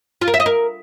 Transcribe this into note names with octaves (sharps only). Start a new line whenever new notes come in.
F4
A#4
E5
D#5
A#4